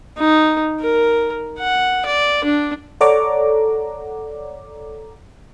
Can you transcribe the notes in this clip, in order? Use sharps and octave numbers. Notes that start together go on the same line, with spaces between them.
D#4
A#4
F#5
D5
D4
A4 C#5 D5 F#5 A#5 D6